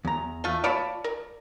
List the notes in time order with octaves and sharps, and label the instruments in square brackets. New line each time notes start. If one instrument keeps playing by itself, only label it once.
[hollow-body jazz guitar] E2 A#5
[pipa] A3 F4
[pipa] F4 C#5 B5 [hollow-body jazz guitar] D5 A5
[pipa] A#4